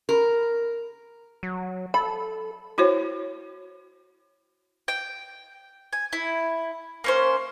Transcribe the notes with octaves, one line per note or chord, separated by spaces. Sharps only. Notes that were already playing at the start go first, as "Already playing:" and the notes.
A#4
F#3
A4 B5
E4 F#4 C5 C#5
G5
G#5
E4
A#3 C#4 C5